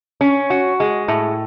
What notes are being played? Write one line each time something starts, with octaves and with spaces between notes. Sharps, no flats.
C#4
F#4
G#3
A2